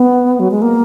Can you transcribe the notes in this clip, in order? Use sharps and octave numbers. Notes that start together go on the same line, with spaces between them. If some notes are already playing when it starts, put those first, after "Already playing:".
Already playing: B3
F#3
G#3
A#3